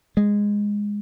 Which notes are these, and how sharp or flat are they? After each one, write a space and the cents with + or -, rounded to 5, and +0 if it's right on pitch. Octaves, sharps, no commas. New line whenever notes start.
G#3 -10